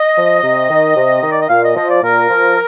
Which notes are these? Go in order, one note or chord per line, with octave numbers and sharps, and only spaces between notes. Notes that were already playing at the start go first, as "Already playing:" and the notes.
Already playing: D#5
F3
C3
D#3
C3
D#3
D5
D#5
A#2 F5
D#5
F3 D#5
D5
A#2 A#4
F3